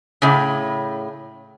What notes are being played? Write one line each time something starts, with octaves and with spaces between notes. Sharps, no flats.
A2 C#3